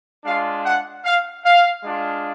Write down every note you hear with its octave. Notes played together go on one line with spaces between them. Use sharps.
G#3 D4 F4 F5
F#5
F5
F5
G#3 D4 F4